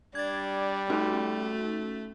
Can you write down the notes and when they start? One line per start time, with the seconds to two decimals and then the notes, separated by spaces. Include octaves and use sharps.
0.15 G3 D4 G#6 A6
0.90 A3 C#4 D#4 F#4